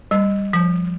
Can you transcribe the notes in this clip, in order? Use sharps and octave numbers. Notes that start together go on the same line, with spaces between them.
G3
F3